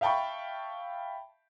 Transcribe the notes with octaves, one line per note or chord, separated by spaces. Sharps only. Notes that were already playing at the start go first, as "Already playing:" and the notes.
E5 F5 G5 A5 B5 C#6